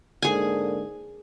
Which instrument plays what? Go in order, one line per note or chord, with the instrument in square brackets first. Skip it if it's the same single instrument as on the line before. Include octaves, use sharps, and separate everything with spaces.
[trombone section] G#2 D3 A#3 [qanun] G#4 G#5